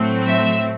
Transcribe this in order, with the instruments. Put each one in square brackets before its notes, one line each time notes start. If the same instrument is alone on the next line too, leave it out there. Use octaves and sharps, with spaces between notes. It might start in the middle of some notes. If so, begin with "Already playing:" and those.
Already playing: [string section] A2 F#3 A3 C4
E5